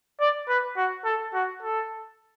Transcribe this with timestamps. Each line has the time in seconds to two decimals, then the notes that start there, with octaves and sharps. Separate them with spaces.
0.20 D5
0.49 B4
0.77 F#4
1.05 A4
1.34 F#4
1.62 A4